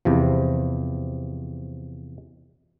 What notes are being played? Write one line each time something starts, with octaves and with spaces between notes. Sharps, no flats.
E2 C3 F3